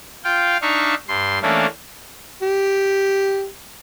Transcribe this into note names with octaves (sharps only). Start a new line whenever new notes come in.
F4 F5 G5
D4 D#4 E5 F5 C#6
G2 C6
E3 A3 A#3 C#4 D4
G4